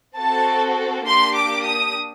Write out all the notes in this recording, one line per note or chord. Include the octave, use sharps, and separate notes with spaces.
C4 F#4 A4 A5
A#3 D4 G4 C6
D6
D#6